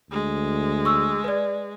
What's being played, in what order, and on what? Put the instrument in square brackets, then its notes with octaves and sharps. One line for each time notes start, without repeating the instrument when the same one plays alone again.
[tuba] D2 [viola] G#3
[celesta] C#6 E6
B4 D5